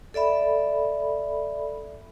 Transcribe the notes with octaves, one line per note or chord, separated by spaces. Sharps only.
A4 D5 E5 B5